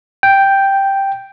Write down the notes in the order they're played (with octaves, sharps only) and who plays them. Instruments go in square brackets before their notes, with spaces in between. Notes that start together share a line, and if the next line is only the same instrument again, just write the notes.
[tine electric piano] G5